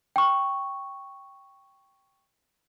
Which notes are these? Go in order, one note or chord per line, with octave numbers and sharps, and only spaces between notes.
G5 C#6